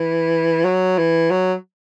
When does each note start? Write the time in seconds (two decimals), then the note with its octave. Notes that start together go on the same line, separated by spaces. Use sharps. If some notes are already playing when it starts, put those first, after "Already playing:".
Already playing: E3
0.64 F#3
0.98 E3
1.31 F#3